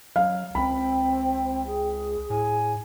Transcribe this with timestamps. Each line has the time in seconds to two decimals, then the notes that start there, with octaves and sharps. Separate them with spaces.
0.16 F#3 F5
0.55 C#2 C4 G5 B5
1.67 G#4
2.30 A2 G#5